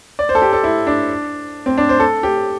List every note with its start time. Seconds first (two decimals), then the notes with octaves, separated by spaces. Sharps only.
0.19 D5
0.29 C5
0.35 A4
0.42 G4
0.53 A4
0.64 E4
0.87 D4
1.66 C4
1.78 D4
1.89 C5
2.00 A4
2.23 G4